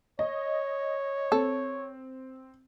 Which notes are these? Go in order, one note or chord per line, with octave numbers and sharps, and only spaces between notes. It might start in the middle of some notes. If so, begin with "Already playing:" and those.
C#5 D#5
C4 A4